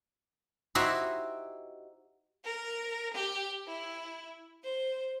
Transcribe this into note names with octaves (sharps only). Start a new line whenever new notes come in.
D#4 E4 F#4 G4 C5 E5
A#4
G4
E4
C5